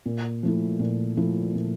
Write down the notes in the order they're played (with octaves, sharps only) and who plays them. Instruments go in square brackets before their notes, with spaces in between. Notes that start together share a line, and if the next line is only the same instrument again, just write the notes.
[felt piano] A#2
F3 A3 E4
A#2
F3 A3 E4
A#2